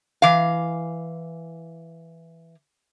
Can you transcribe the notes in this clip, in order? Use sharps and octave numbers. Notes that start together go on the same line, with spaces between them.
E3 F5